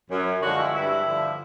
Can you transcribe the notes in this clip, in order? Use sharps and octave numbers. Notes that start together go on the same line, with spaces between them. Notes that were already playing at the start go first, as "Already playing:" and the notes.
F#2
D3 F3 G#3 F#4
E4
G2 E4
D3 F3